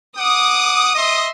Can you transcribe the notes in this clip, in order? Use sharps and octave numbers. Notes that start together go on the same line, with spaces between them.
F#5 D6 D#6
D#5 E5 C6